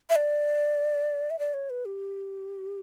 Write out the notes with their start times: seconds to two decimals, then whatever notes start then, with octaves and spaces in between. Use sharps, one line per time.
0.10 E5
0.16 D5
1.30 E5
1.39 D5
1.54 C#5
1.70 B4
1.85 G4